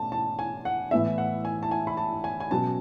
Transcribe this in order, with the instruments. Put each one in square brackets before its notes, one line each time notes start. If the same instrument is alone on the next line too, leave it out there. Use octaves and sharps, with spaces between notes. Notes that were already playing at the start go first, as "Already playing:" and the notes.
Already playing: [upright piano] B2 A3 C#4 A5
A5
G#5
F#5
A2 E3 B3 E5
F#5
G#5
A5
G#5
B5
A5
G#5
G#5
B2 F#3 C#4 A5